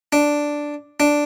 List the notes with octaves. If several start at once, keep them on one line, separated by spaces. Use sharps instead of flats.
D4
D4